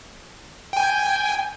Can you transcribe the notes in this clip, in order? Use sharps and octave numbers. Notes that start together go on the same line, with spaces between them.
G5 G#5